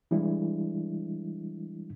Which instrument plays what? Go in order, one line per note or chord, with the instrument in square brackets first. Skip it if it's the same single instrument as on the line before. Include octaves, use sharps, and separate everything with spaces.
[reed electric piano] E3 G3 G#3 D4 E4